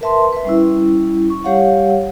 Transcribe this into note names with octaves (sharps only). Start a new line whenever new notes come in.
A#4 B4 E5 A5 C6
B4 E5
G3 C#4 E4
C#6
G3 G4 C#5 F5 F#5